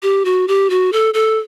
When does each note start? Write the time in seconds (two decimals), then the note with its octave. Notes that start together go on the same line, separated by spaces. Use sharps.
0.03 G4
0.25 F#4
0.48 G4
0.70 F#4
0.93 A4
1.14 A4